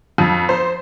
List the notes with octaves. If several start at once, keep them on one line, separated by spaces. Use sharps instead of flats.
F2
C5